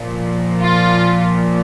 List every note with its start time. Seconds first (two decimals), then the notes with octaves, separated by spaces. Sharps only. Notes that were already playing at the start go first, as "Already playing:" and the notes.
Already playing: A#2 F3
0.61 F4